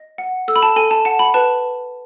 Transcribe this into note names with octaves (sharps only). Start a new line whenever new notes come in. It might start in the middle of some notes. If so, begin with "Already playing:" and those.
Already playing: D#5
F#5
A4 E6
B5
A5
A4 G#5
A5
F#5 A5
B5
B4 A5